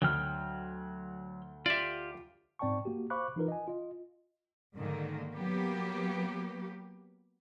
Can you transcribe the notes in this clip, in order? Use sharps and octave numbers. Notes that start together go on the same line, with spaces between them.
D2 F#3 G5 F6
F4 G4 D5 E5
G#2 C4 D5 G5 A5 C#6
A#3 F#4 G4
C5 F5 B5 C#6 D6 F#6
E3 D#4 F4 A#4 B4
D#5 G#5
F4 D#5
G#2 D3 D#3 A#3
F#3 A#3 B3 G4